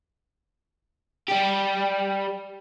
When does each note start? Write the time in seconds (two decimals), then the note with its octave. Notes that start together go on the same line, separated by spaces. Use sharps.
1.28 G3 G4